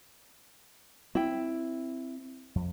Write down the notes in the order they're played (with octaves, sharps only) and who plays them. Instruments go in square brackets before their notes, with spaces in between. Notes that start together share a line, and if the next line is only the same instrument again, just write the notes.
[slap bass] C4 [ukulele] E4 G5
[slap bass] F2